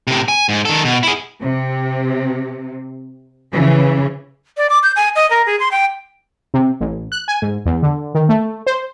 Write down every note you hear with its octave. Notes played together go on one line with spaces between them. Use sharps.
A2 C3
G#5
G#2
D#3 A4
B2
E4 G#4
C3
C#3 E3
D5
D6
G6
G#5
D#5
A#4
G#4
C6
G5
C3
A1
F#6
G#5
G#2
E2
D3
D#3
A3
C5